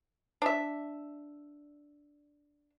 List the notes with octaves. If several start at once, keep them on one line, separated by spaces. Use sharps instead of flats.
D4 E5